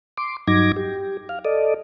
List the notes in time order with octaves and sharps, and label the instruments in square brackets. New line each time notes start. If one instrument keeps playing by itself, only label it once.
[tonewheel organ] C6 D6
G2 F#3 D#4 D6 G#6 A#6
G4
F5
A4 D5 D#5